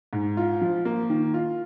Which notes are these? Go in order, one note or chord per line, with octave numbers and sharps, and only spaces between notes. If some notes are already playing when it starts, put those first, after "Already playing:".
G#2
F4
F3
A#3
D#3
F4